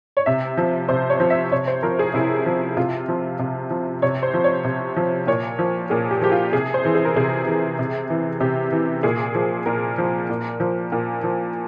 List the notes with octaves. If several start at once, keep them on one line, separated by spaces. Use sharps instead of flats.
C#5
C3 E5
F3
C3 C5
C#5
F3
E5
C3 C#5
C5
F3 A#4
G#4
C3 E4
F3
C3 F4
F3
C3
F3
C3 C#5
C5
F3
C#5
C3
F3
A#2 C#5
F3
A#2 G#4
G4
F3 G4
F4
C3 G#4
C5
E3
G#4
A#4
C3 G#4
E3
C3
E3
C3 G4
E3
A#2 G#4
F3
A#2 A#4
F3
A#2
F3
A#2
F3